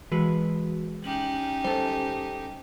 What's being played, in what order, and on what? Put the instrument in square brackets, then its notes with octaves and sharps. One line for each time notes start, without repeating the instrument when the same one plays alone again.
[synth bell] E3 F#4 [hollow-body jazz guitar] G#3 B4
[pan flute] C#4 [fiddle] D#4 G4 [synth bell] F#7
[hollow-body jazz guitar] G3 A4 [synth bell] C5